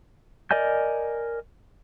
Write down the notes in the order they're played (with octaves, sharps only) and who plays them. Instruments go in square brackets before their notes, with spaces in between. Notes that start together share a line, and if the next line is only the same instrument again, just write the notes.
[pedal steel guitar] A#4 D5 D#5 G#5 G6